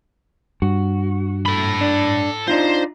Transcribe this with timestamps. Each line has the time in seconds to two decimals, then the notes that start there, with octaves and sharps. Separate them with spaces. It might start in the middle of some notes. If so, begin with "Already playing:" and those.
0.62 G2 F#4
1.46 A4 B5
1.81 D4
2.48 D4 D#4 F4 C5